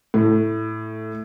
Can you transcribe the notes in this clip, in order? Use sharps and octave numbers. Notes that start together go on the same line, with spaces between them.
A2